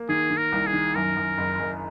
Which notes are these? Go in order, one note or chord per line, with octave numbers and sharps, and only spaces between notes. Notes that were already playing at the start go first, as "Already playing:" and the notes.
Already playing: A#3
D#3 G#4
D#3
A#4
C2
G#4
D#3
F#2 A#4
F#2
F#1
F#1